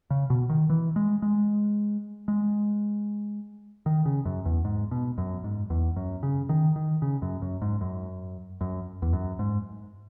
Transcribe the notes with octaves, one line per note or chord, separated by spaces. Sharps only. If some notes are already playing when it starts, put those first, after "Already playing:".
C#3
B2
D#3
E3
G#3
G#3
G#3
D#3
C#3
F#2
E2
G#2
B2
F#2
G#2
E2
F#2
C#3
D#3
D#3
C#3
F#2
F#2
G#2
F#2
F#2
E2
F#2
G#2